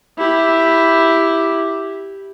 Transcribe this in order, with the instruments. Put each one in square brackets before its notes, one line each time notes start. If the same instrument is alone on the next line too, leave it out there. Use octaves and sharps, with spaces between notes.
[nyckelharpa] E4 G4